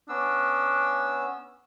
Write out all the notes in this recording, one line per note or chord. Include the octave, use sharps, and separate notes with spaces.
B3 C#4 D4 E6